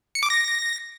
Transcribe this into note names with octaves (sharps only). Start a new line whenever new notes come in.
C#7
D6
A#6